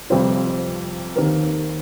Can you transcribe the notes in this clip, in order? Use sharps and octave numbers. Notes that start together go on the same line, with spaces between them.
F2 C3 G3 C4 F4
D#2 D#3 C4 G4 A#4